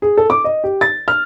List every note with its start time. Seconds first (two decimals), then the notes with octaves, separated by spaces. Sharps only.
0.02 G#4
0.17 A4
0.30 D6
0.44 D#5
0.64 G4
0.81 A6
1.08 F6